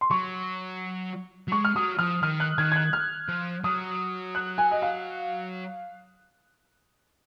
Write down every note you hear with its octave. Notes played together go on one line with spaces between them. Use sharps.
C6
F#3 C#6
F#3
G#3 C#6
F6
F#3 D#6
F3 F6
D#3 F6
F#6
D#3 G#6
G#6
F#6
F6
F3
F#3 D#6
F#6
G#5
D#5
F5